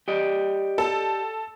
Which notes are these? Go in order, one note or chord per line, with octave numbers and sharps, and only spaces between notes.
G4 D5 D#5
A4